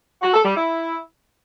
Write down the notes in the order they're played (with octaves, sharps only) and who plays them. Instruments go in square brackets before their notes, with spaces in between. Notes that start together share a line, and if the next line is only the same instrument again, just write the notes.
[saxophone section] F#4
A4
G3
E4